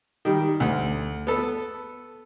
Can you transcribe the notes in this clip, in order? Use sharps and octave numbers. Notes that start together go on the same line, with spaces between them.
D#3 G3
D2
B3 A4